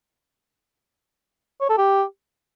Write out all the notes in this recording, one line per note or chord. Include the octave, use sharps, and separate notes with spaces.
C#5
A4
G4